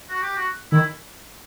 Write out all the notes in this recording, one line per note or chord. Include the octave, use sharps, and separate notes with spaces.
F#4
G4
F#4
D#3 E4